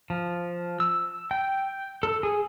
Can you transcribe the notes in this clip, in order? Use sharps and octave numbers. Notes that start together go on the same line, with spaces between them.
F3
E6
G5
A4
G#4